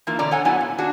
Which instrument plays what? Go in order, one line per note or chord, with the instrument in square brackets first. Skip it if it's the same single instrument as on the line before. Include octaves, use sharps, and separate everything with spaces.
[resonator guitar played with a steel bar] E3 A#3 E4 F4
B2 D3 C#4 D5 A#5
A4 C#5 F#5 G#5
F#3 B3 E4 G#5
A#2
D4 F#4 G#4